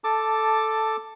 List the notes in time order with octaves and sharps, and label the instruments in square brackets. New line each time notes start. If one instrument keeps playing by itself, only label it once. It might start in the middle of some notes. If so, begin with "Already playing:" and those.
[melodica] A4 A5 D6